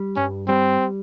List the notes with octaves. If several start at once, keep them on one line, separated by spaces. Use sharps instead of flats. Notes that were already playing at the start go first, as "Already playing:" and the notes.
Already playing: G3
G2 C#4
G3 C4